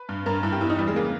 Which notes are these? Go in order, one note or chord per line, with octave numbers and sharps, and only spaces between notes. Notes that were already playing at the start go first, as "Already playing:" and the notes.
Already playing: B4
G2
G2 A#4
G2 E4
G4
E2 E4
D#4
E3 G3
G#3
C#3 A#3